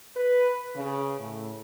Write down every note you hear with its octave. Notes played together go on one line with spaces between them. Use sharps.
B4
C#3
A2